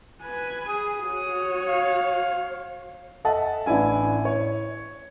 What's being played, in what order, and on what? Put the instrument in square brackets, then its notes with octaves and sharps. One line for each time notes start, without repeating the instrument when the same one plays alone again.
[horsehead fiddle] B4 G#5
[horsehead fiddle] G#4 [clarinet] D#6
[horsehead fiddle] F#4 C#5
[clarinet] F5
[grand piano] A4 D#5 E5 F#5 A5
A1 D4 E4 G#5
C#5